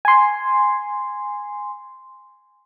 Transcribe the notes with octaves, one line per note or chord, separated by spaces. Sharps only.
G#5 C6